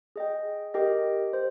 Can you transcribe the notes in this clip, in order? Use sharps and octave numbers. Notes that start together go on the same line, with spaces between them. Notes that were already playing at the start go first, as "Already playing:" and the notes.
G#4 D#5 G5
G4 A#4 D#5 G5
C5